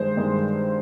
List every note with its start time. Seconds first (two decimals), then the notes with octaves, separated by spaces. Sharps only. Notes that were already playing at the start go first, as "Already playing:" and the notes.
Already playing: G2 D#3 G#3 C5
0.17 G2 D#3 G#3